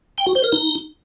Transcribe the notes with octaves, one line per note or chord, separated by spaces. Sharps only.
G5
F#4
C5
A#4
D#4